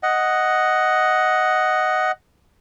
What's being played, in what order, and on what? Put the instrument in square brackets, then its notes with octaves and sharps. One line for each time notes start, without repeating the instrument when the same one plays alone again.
[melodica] D#5 F#5